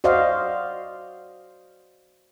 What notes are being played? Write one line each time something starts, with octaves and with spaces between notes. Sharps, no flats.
F#4 C5 D5 D#5 F5